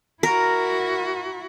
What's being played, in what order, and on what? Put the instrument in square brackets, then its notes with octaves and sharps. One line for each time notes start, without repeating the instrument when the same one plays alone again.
[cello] E4 F#4 [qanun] A#4